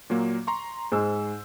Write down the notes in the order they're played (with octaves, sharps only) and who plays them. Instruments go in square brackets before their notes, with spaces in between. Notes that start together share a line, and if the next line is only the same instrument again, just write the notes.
[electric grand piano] A#2 F#3 A#3
A#5 C6 C#6
[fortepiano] G#2 [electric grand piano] C5 E6